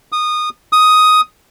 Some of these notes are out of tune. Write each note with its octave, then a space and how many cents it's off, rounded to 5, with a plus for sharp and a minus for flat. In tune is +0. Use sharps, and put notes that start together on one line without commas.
D#6 -20
D#6 +5